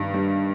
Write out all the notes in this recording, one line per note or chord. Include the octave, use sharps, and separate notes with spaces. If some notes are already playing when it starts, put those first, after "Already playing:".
Already playing: G2 D#3
G3